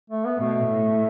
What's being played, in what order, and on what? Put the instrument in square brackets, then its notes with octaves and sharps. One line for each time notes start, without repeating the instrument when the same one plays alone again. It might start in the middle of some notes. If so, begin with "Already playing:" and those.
[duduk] A3
B3
[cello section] B2 [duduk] A3
[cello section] A2